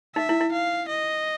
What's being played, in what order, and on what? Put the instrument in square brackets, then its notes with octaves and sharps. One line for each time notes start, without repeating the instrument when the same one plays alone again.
[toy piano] D#4 [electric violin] E5
[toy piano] E4
E4
[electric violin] F5
D#5